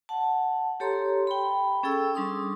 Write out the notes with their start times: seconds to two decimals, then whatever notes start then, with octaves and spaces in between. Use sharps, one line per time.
0.09 F#5 A5
0.80 G4 A4 C#5 A#5 C6
1.27 G5 B5
1.83 C#4 G#4 A4 G5 E6
2.13 G3 D4 C6 C#6 D#6 E6